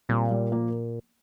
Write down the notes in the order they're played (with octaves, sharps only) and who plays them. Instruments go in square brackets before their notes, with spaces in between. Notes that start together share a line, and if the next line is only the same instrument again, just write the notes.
[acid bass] A#2 [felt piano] G3 C4
[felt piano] G3
F3 A#3